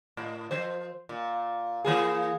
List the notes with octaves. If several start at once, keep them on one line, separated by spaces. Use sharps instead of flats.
A2
F3 C5
A#2
E3 A#3 G#4